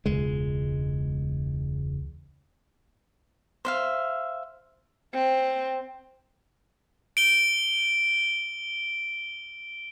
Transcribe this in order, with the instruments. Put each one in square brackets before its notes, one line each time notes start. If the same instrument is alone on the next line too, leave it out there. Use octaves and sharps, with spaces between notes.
[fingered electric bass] E1 C#2 G#3
[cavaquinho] C5 E5 F5
[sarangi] C4
[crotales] D7 G7